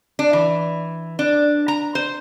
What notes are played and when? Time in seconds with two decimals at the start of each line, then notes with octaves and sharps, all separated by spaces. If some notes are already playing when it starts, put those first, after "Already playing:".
0.19 D4
0.33 E3
1.19 D4
1.68 A#5
1.95 C5